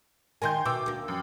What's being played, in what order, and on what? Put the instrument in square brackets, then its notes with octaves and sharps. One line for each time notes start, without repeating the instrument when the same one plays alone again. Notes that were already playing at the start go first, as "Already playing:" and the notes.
[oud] D#3 D#4 A#4 [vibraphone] G5 [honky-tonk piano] G#5 C6 G6
[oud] B2 [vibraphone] F#4 E5 [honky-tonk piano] G5 D6 E6
[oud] D2 A#3
[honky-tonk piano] F#2 [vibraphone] G5 D6 D#6